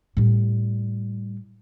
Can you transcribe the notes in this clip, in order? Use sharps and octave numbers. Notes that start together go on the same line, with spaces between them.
A2 G3